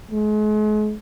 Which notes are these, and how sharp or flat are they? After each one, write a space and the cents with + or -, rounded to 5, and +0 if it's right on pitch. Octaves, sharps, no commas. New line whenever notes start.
G#3 +40